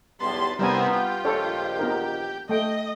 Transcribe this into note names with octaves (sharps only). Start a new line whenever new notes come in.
B1 E2 G3 B3 A5 C6
C3 G3 B3 C4 E4 A#4 D5 G#5
F4 G4
A#1 D#3 A4 C#5 D5
B3 D#4 A#4
A3 D#5 G5